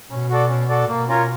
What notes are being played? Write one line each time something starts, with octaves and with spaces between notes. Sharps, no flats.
B2 C#4
F#4 A4 D5
C#4
F#4 A4 D5
B2 A#3
C#4 F4 A#4 C#5